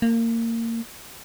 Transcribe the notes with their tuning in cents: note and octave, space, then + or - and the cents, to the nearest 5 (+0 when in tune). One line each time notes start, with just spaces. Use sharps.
A#3 -25